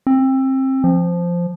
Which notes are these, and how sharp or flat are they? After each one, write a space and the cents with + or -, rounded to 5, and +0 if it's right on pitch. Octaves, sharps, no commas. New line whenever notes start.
C4 +25
F3 -5